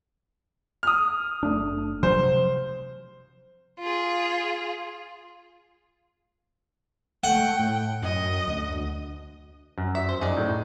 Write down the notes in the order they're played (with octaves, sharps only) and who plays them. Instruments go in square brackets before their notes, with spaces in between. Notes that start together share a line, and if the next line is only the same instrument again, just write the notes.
[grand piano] D#6 F6
[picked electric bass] F#1 A3 D4
[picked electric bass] C3 F3 F#3 [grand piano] C5
[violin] F4 G#4
[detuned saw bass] A3 [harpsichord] F#5 [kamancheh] G5
[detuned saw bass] A2
[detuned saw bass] F#2 [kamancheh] D#5
[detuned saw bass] D2
[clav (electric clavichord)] F#2
[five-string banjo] E5
C5
[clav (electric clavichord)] F#2 G#4 [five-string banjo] D#4 D5
[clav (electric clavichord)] A2